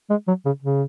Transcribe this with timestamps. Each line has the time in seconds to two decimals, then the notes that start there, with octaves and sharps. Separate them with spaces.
0.10 G#3
0.28 F#3
0.46 C#3
0.62 C#3